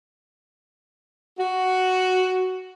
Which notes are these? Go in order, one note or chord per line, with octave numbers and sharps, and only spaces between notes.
F#4